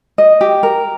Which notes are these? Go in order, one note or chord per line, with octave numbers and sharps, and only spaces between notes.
D#5
G4
A#4